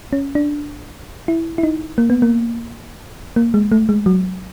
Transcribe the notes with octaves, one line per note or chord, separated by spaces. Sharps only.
C#4
D4
E4
E4
D#4
A#3
B3
A#3
A#3
G#3
A3
G#3
F#3